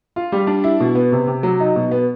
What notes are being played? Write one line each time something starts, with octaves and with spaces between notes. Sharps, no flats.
F4
G3
D4
E4
B2
B3
C3
C3
F#3
D#4
B2
B3